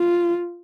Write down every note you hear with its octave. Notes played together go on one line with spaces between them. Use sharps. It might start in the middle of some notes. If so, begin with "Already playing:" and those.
Already playing: F4